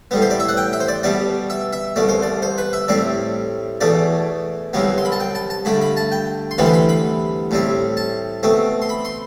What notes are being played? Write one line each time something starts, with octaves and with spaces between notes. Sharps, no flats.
A2 G3 B3
C5
D5
E5
F#5
G5
E5
C5
D5
B2 G3 B3 D5
E5
E5
C2 B2 A3 D5
C5
D5
C5
B4
E5
A2 G3 C4 D5
E2 B2 A3 D5
C2 C3 F#3 B3
C6
B5
A5
G5
A5
A5
G2 D3 A3 B5
B5
A5
G5
C6
D2 C3 E3 G3 B3 B5
C6
B5
B5
A2 G3 C4
A5
B2 A3 C4
C6
B5
C6